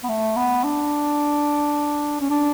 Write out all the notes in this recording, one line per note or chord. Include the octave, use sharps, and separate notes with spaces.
B3
A3
B3
D4
C#4
D4